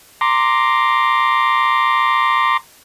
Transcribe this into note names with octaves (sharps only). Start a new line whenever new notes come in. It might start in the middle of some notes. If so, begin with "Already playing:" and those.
A#5 C6 D6